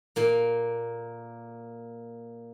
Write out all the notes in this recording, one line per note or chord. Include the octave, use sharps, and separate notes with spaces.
A#2 A#3